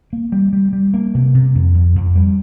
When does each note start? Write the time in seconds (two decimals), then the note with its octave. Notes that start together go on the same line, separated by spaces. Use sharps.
0.13 A#3
0.32 G3
0.53 G3
0.73 G3
0.94 A#3
1.14 C3
1.35 C3
1.55 F2
1.75 F2
1.96 F2
2.15 G3